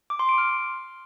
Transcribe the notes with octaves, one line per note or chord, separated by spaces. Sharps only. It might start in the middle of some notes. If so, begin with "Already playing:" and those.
D6
C6
D7
F6